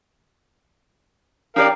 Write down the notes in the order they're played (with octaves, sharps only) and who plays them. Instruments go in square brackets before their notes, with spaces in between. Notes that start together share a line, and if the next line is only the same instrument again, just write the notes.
[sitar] C#4 G4 D5 [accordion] A#4 F5